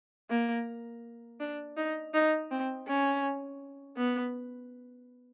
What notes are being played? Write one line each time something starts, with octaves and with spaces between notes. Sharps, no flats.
A#3
D4
D#4
D#4
C4
C#4
B3